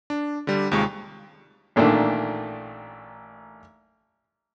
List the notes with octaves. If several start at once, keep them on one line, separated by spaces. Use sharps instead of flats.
D4
D3 G3
D#2 C3 G#3 F4 C#6
A1 A#2 D#3 A3 D4